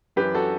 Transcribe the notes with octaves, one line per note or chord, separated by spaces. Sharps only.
F#2 E3 G4 B4
F#4 A4